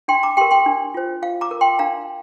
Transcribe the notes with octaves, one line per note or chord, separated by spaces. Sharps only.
D4 G5 C6
A#5 D6
G4 A#4 G5 C6
G5 C6
D4
F4 C5
F4 F5
A#5 D6
A#4
G5 C6
D4 F5 A#5